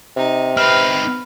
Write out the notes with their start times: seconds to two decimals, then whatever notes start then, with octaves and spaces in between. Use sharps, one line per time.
0.17 C3 D#4
0.57 C4 D#4 B4 F5 F6